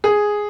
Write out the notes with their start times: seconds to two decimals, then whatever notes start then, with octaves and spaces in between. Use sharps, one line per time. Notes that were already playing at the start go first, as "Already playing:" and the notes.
0.04 G#4